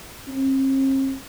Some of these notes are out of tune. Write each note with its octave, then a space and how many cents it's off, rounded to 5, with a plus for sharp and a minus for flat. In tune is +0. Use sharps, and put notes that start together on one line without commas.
C4 +45